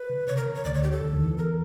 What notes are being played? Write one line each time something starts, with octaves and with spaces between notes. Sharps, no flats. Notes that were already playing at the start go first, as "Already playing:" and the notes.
Already playing: B4
C#3
C3 C#5
A#4
C#3
C#5
D2 D3 D5
C#5
G4
A4
D2 D3
D#2 D#3
E2 E3
A#4